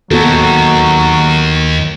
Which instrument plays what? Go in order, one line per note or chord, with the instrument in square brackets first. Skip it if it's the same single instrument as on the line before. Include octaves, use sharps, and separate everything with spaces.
[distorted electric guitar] D#2 [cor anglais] F#3 [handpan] B3 F#4 A4